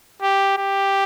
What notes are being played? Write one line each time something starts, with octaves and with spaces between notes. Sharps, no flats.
G4
G4